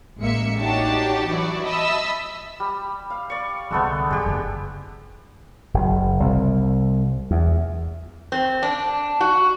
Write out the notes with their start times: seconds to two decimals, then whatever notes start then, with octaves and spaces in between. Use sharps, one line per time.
0.18 A1 G#3 A#3 E5 C#7
0.58 D4 D#4 F#4 G4 C#5 A5
1.28 E3 F#3 E4 F#4 D5
1.65 D#5 E5 A5 B5 D#6 E6
2.60 G3
3.10 F5
3.30 D5 C#6
3.71 C2 D3 G#3 A3 B3
4.11 G2 G#3 G4
4.26 F#1
5.74 F#1
6.20 C2
7.31 E2
8.32 C4
8.63 D4
9.21 F#4